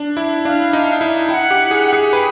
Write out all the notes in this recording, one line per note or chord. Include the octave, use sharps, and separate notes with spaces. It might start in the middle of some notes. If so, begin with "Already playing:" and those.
Already playing: D4
E4
D4 F5
D#4
E4
E4 G5
F#5
G4
G#4
G#4
B4 G5